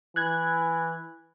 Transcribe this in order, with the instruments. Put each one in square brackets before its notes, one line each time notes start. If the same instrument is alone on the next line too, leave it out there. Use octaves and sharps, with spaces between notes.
[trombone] E3 [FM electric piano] F#6 G#6